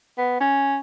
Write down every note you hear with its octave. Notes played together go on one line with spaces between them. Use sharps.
B3
C#4